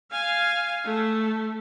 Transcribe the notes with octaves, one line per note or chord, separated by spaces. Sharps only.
F5 G#5
A3